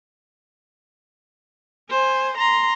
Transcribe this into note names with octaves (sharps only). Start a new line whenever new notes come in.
C5 G#5
A#5 C6